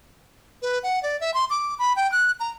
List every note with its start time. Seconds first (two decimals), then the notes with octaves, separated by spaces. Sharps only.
0.62 B4
0.83 F#5
1.03 D5
1.20 E5
1.34 C6
1.50 D6
1.79 B5
1.96 G5
2.12 F#6
2.40 A#5